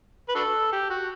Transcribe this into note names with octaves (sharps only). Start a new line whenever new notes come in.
B4
D4 F#4 A4
G4
F#4